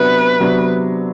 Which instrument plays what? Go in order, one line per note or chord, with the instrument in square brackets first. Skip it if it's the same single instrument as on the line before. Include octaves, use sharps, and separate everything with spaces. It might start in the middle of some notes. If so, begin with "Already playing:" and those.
Already playing: [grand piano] C3 F#3 B3 D4 [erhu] B4
[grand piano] C3 F#3 B3 D4